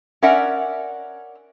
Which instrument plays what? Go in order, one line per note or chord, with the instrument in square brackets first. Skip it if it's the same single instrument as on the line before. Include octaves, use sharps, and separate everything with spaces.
[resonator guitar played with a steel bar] C#4 A#4 D5 E5 F#5